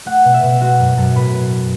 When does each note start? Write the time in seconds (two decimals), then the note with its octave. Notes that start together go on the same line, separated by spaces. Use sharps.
0.06 A3 F#5
0.25 B2
0.34 E5
0.43 B2
0.61 G#3 F#4
0.79 F#2
0.97 F#2 A4
1.16 A2 B4